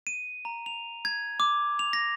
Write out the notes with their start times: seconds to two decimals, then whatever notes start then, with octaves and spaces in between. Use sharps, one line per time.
0.07 D#7
0.45 A#5
0.66 F7
1.05 G#6
1.40 D6
1.79 F7
1.93 A#6